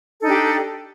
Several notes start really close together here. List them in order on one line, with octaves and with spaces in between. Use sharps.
A4 D#4 D4 G4